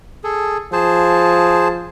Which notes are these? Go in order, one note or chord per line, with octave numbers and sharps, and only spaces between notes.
G#4 A4
F3 G#4 C5 A5